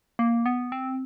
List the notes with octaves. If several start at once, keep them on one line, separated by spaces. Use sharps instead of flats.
A#3
B3
C4